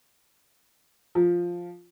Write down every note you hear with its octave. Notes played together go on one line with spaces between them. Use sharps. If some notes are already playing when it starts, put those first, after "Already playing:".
F3